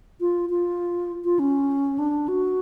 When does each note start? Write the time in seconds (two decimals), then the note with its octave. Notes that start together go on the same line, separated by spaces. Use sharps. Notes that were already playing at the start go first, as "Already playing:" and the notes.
0.21 F4
0.50 F4
1.25 F4
1.39 C#4
1.99 D4
2.28 F#4